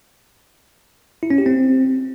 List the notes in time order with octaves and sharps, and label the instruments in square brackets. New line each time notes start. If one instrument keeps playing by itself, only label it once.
[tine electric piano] E4
C#4
G4
C4